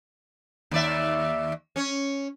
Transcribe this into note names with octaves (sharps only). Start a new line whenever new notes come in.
D#2 D5 E5
C#4 C#5